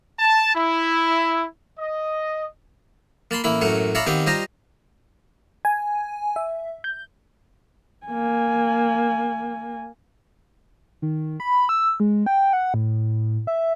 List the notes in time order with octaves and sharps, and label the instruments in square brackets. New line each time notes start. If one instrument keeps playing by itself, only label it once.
[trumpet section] A5
E4
D#5
[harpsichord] A#3 A5 B5 C6
A1 A#3 E4 B5
A1 F#2 A3 A#3 C#5
C#5 D5 E5 F5 A#5 B5
D#3 B3 C4 G4 F5 D6
G3 F4 C5 D#5 A#5
[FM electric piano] G#5
E5
G6
[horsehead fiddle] A#3 G#5
[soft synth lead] D#3
B5
E6
G#3
G5
F#5
A2
E5